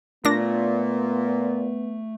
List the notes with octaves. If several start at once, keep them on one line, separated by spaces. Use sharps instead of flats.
A#2 A3 B3 D4 A#6